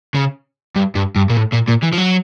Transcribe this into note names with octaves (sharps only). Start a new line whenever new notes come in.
C#3
G2
G2
G2
A#2
A2
A#2
A#2
E3
F3
F#3